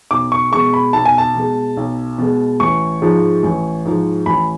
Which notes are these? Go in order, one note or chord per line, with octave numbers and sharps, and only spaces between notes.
B1 D6
C#6
B2 G#3 C#6
B5
B1 A5
G#5
A5
B2 G#3
B1
B2 G#3
A1 C#6
G#2 F3 G#3
A1
G#2 F3 G#3
A1 B5